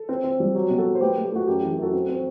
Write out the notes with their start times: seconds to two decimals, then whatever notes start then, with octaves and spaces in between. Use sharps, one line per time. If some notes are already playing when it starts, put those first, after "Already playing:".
Already playing: A4
0.09 C4
0.24 C4
0.40 G3
0.54 F#3 G4
0.70 B2
0.78 F#4 A4
0.86 F#3
0.95 C5
1.01 A3 G4 B4
1.16 A3
1.24 G4
1.32 A3 F#4
1.47 F#2 G4
1.59 G4
1.63 E3
1.71 G4
1.78 F#2 F#4 A4
1.93 C4
2.09 C4